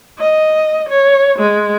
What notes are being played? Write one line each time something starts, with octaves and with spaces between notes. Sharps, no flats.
D#5
C#5
G#3